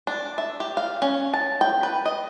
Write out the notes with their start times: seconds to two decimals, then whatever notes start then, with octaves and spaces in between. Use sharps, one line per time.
0.07 D4
0.38 E5
0.60 G4
0.77 F5
1.02 C#4
1.34 A5
1.61 G5
1.83 B4
2.05 D#5